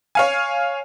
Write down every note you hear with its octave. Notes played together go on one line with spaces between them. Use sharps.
C#5 F5 G#5